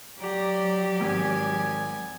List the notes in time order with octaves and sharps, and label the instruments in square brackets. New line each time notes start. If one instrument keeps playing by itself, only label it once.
[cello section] F#3 [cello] G4 [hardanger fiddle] D5 A#5
[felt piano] G#1 [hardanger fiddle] G#5